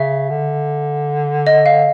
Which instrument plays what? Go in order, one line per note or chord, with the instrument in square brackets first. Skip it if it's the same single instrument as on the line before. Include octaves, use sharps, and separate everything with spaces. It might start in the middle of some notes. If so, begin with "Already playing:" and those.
Already playing: [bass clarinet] C#3 [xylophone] E5
[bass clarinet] D3
[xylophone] D#5
F5